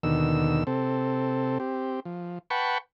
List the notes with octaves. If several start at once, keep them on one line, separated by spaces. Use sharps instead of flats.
D#2 B2 D3 D#3 E6
C3 C4 A4
C4 G4
F3
B4 F#5 G5 A5 B5 C#6